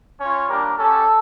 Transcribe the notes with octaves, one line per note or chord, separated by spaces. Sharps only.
C#4 F4 C#5
G3 A#3 D4 G4 A#4
C#4 G4 A4